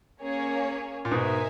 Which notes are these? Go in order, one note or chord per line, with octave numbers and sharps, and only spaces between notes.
A#3 C#4 G#4 C#5
A#2
G#2 B2 D#4 A#4 E5 G#5